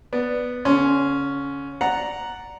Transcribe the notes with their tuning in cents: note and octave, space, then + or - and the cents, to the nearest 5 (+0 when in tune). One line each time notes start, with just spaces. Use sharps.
B3 +0 D5 +0
D3 -35 C#4 +5 C6 +0
D5 +0 F#5 +0 A#5 +0